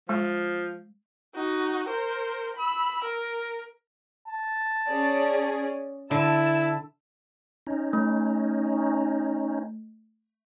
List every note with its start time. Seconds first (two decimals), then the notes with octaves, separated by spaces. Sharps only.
0.09 F3 G#3
1.35 D#4 F#4
1.88 A#4 C5
2.57 B5 E6
3.05 A#4
4.27 A5
4.90 C#4 G#4 D5
6.11 D3 E4 A5 E6
7.67 C#4 D#4
7.93 A3